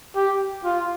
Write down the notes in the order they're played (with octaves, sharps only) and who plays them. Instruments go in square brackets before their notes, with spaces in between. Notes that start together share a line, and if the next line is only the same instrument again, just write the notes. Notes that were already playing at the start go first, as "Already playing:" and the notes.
[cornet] G4
F4